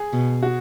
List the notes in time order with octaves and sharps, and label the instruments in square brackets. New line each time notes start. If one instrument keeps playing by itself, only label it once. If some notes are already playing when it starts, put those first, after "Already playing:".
Already playing: [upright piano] G#4
[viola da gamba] B2
[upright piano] F#4